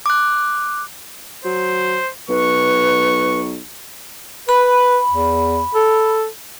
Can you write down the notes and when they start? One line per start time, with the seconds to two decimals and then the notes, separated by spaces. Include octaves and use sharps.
0.06 D6 F#6
1.45 F#3 C5
2.29 B1 B4 C#6
4.49 B4 B5
5.11 E2
5.75 A4